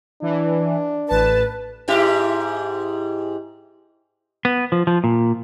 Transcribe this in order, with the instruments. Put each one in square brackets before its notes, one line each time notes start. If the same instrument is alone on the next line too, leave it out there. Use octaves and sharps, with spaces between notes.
[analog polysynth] E3 [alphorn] D4
[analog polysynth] A1 A5 [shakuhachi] B4
[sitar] G#2 E4 G4
[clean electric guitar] B3
F3
F3
A#2